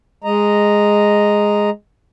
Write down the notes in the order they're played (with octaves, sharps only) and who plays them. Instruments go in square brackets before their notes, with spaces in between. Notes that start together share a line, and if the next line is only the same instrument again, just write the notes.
[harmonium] G#3 D#5 A#5